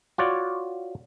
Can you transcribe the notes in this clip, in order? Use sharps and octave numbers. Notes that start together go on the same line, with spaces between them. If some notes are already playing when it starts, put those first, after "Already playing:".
F4 F#4 C#5 D5